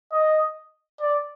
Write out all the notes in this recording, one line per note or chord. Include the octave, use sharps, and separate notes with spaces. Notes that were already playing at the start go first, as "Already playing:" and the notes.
D#5
D5